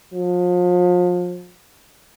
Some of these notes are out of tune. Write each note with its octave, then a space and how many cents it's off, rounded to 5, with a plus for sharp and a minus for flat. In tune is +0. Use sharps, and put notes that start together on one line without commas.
F3 +35